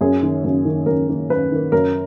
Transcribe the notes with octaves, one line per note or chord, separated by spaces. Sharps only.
F#2 G#4
D#3 A#3
F#2
D#3 A#3
F#2 A#4
D#3 A#3
F#2 B4
D#3 A#3
F#2 A#4